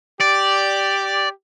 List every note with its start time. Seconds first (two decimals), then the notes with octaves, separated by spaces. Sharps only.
0.21 G4 D5